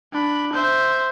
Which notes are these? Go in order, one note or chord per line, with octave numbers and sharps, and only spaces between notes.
D4 B5
C5 E5